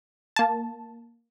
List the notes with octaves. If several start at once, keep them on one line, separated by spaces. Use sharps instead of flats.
A#3 A5